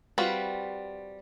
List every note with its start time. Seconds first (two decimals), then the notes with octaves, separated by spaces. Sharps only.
0.18 G3 C4 F4 F#4 B4